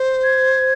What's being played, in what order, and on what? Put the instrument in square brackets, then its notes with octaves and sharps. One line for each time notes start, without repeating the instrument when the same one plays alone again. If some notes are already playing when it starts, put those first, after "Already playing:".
Already playing: [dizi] C5
[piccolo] G#6